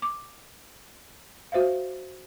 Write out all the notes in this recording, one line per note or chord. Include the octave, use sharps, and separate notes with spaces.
D6
F#4 C5 E5 F5